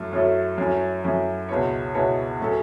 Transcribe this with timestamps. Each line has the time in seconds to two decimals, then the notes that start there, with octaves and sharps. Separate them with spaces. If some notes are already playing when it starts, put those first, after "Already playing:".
Already playing: F#2 F#3 A3 E4
0.13 F#2 F#3 A3 E4 A4
0.58 F#2 F#3 A3 C#4 E4
1.04 F#2 F#3 A3 C#4 E4
1.49 C#2 B2 B3 E4 C#5
1.94 C#2 B2 B3 E4 C#5
2.40 A2 F#3 C#4 A4